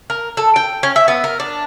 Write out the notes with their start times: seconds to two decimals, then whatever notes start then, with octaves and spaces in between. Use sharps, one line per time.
0.10 A#4
0.37 A4
0.56 G5
0.83 C#4
0.96 E5
1.08 B3
1.24 A#4
1.40 D4